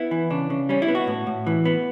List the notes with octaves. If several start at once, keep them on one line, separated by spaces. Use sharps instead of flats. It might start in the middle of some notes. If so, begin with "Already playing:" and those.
Already playing: B3 E4
E3
C#3 D4
C#3
G3 C#4
E4
B3
F#4
A2
A2
E3
B3